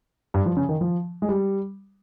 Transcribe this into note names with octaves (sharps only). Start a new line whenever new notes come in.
G2
F3
C#3
D#3
F3
G#3
G3